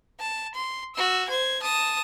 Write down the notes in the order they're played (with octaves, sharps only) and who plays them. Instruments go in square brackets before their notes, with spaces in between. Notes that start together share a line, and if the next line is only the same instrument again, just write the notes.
[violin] A5
C6
F#4 E6
C5 G#6
A5 D#6